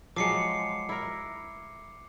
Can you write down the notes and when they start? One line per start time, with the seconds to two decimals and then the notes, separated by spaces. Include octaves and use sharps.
0.16 F3 F#3 G#3 D6 C7 C#7
0.89 E4 A#4